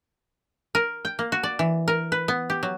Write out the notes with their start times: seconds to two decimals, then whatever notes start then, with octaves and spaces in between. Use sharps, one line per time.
0.75 A#4
1.05 G5
1.19 A#3
1.32 F#4
1.43 D5
1.59 E3
1.88 A#4
2.12 B4
2.28 B3
2.50 G4
2.63 F#3